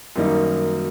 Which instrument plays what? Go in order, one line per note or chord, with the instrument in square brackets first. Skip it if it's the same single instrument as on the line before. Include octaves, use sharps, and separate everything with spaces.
[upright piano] F#2 D#3 G3 A#3 D#4